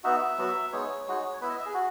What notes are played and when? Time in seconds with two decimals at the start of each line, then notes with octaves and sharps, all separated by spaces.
0.04 B3 D#4 F#4 E5
0.38 F#3 B3 F#4
0.72 G#3 B3 D#4 C#5
1.07 G#3 D#4 F#4
1.41 B3 E4 B4
1.50 D#5
1.58 E5
1.66 G#4
1.74 F#4